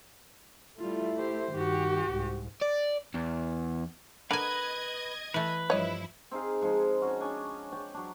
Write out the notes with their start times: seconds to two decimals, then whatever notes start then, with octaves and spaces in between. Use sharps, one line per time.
0.79 G3 A3 E4 F4
1.16 G4 C5
1.53 G2 D#3 F#4 G4
2.11 C2 G#2
2.61 D5
3.14 E2
4.31 D3 A#4 B4 D#5 G#5 G#6
5.34 E3 A3 B4
5.70 G2 F3 E4 C#5 D#5
6.31 C4 D#4 G#4 F5
6.61 F3 G#3 D#4 C5
7.02 C#4 F#4 F#5
7.20 C#4 D4 G#5
7.72 C#5 D5 G5
7.94 F#3 D4